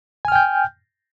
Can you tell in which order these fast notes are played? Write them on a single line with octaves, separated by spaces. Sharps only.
G#5 F6 G5 G6